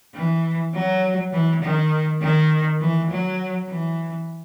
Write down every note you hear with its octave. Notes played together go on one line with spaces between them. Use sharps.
E3
F#3
E3
D#3
D#3
E3
F#3
E3